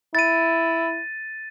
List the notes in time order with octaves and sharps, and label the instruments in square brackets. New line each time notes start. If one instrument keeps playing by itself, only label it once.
[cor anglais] E4 [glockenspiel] A6 D#7